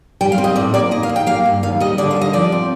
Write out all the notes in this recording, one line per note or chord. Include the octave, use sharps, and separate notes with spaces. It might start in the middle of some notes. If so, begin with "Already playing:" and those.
G3 G5
F5
C4
D#5
A2 D5
A#3 D5
D#2 D#5
F5
D#2
G5
A#3 F5
G2
D#2 F5
G3 D#5
D3 D5
F5
G3
D#5
F3 D5
C4